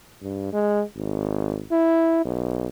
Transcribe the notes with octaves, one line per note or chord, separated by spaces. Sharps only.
G2
G#3
G#1
E4
B1